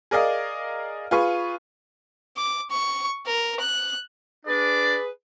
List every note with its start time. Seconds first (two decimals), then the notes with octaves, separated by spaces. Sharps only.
0.11 G#4 A#4 D5 D#5 F5
1.11 F4 G#4 B4 F5 C#6
2.36 D6
2.70 C#6
3.26 A#4
3.60 F#6
4.46 D4 G#4 B4 D5